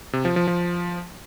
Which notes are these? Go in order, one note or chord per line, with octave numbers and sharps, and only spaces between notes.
C3
F3
F3
F3